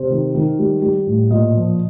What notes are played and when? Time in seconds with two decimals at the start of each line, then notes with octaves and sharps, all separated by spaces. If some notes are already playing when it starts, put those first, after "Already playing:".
Already playing: C3 C5
0.10 D#3
0.34 D#3
0.59 G3
0.82 G3
1.07 A2
1.31 A#2 D#5
1.55 F3